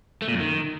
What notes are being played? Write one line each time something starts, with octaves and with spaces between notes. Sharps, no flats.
A3
A#2
F#2
D#3